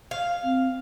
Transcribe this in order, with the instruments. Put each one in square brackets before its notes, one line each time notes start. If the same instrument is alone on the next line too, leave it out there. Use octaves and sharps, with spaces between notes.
[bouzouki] F5
[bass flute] C4